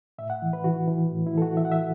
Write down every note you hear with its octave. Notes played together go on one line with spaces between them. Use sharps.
A2 E5
F#5
E3
B4
E3 F#4
E3
A2
E4
E3 A4
F#4
E3 E5
F#5
E5